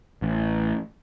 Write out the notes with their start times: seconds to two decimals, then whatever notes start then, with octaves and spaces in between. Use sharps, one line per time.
0.22 A1